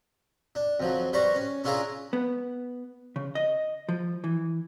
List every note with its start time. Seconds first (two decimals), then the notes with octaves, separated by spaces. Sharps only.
0.55 D4
0.80 F2 F3 F#3
1.13 G3 B4 C5 D5 A#5 C#6
1.35 C#4
1.64 C#4 D4 E4 F4 G#4 A#4
2.13 B3
3.16 C#3
3.35 D#5
3.89 F3
4.24 E3